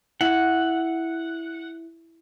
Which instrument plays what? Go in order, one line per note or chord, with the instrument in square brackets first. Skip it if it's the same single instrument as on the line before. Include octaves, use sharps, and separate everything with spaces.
[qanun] E4 [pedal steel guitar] F#5